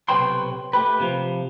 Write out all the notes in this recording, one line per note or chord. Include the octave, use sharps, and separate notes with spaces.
B1 C3 B4 C#5 G5 C6
A3 G4 B4
C3 F3